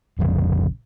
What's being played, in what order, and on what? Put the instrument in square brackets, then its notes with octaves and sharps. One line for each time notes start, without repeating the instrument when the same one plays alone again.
[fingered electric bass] F1 A#1 F2 C#3